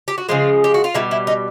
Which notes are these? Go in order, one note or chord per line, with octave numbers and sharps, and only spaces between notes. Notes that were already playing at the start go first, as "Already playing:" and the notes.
G4
F#4
C#3 F3 G#3 F4
G4
F#4
F4
B2 G3 E4
E4
D#4